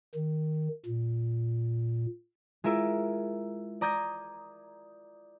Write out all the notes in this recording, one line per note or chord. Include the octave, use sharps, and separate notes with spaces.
D#3
A#2
G#3 E4 F4 A#4 E5 E6
D5 A#5 D#6 G6 G#6 A#6